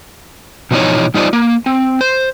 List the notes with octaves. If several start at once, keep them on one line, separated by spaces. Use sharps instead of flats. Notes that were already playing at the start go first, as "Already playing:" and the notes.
B2 E3 F3 D#4 C#5
G3 D#4 F4 B4 C5 D5
A#3
C4
C5